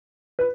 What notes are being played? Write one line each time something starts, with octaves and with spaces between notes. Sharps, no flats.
B4